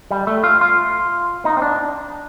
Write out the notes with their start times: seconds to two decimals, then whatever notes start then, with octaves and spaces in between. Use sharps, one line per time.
0.11 G3
0.27 A3
0.44 F4
0.61 F4
1.45 D#4
1.57 C4
1.62 D4